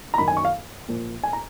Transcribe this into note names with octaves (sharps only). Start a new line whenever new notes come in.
A#5
F#2 D#3 F#3 B5
G#5
C#6
F5
A#2 F3
G#5
A#5